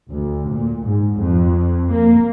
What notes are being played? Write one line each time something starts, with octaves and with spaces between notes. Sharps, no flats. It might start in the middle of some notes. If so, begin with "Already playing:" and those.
D2
A#2
G#2
F2
A#3